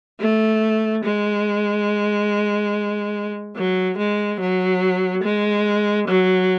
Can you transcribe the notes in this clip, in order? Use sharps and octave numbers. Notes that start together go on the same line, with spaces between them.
A3
G#3
F#3
G#3
F#3
G#3
F#3